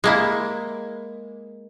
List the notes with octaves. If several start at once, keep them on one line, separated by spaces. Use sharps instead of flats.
G#3 A#3 E4